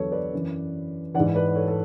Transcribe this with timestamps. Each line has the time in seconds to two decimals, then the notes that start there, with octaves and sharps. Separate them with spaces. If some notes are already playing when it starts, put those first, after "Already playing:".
Already playing: E2 D3 F#3 A4 B4 C#5
0.12 B4 D5
0.33 F#2 E3
1.14 E3 D5 F#5
1.20 G#2
1.35 B4 D5
1.48 D5
1.55 A4 C#5
1.68 A4